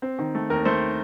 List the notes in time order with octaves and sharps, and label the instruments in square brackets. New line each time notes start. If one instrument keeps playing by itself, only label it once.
[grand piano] C4
D#3
A3
D#2 A#4
A3 C5